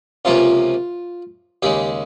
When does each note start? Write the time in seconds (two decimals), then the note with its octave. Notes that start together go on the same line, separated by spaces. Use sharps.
0.25 C#2 C3 F3 A#3 C#4 F4
1.63 D#2 C#3 G#3 G4